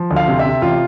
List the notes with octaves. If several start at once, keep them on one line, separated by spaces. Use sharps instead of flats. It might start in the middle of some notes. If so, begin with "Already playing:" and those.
Already playing: F3
D2
F5
C3
E5
C3
A1 F4